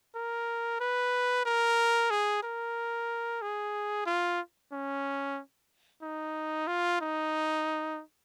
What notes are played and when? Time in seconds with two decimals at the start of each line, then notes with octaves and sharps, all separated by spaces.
0.16 A#4
0.80 B4
1.45 A#4
2.11 G#4
2.43 A#4
3.42 G#4
4.06 F4
4.72 C#4
6.02 D#4
6.67 F4
7.01 D#4